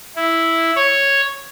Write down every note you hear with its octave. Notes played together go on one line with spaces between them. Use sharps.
E4
C#5